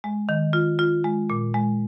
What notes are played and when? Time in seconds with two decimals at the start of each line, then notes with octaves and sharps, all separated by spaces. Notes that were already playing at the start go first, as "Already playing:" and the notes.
0.04 G#3
0.29 D#3
0.53 F4
0.79 F4
1.04 G#3
1.30 A#2
1.54 G#3